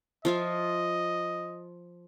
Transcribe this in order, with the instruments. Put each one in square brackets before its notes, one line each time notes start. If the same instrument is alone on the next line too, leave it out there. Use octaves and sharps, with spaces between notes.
[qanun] F3 F4 E5 [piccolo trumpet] D#5